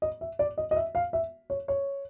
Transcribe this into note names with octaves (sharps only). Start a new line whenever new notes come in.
D#5
E5
D5
D#5
D#5
E5
F5
E5
C#5
C#5